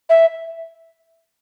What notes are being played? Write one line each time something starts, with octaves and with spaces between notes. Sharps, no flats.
E5